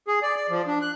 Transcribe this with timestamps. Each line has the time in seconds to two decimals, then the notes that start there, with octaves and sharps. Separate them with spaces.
0.08 G#4
0.22 D5
0.37 D5
0.50 F3
0.67 D4
0.82 F#6